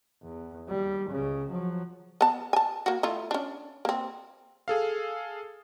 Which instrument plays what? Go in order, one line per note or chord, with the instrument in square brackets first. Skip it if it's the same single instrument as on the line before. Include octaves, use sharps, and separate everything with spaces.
[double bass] E2
D#2 G3
C#2 C#3
F3 F#3
[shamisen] B3 A5
G#5 A5
A#3 F#4
A3 E4 F4
C#4 D4
A#3 C4
[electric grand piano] G#4 A4 F5